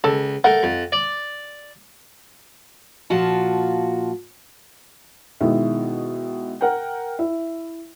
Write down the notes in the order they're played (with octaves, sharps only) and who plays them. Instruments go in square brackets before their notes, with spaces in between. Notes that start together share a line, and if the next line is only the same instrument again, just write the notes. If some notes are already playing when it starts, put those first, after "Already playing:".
[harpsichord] C#2 [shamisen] A4
[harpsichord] A3 A#4 [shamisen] F#5
[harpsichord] F2
D5
[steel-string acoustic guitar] A#2 F3 F4 F#4 A5
[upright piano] B2 D#3 G#3 E4
A#4 F#5 G5
E4